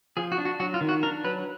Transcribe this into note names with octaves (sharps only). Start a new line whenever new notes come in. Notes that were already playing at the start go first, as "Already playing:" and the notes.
F3 G#4
F#4
D4
F#4
F#3 F#4
F4
D#3
F#4
D4 A#4
F#3 B4